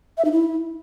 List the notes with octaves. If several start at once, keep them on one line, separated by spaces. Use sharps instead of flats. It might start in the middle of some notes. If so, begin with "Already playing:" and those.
E5
D#4
E4